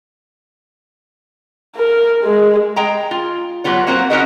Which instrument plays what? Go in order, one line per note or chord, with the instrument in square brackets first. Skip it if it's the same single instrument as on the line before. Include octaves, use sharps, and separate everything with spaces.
[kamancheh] A#4
G#3
[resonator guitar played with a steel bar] G#3 G5 A#5
F4
F#3 G3 B3 F4 C#5
F#3 A#3 C4 F#4 A#4 C5
C#4 D#4 F#4 A#4 B4 D#5